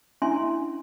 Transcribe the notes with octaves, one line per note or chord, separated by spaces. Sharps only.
C#4 D4 E4 E5 G#5 C6